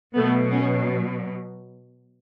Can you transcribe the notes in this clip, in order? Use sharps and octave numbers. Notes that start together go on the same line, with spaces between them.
B2 F#3 A3 B3
B3 C#4